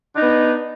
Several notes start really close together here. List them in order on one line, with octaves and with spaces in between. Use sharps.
D4 D#4 B3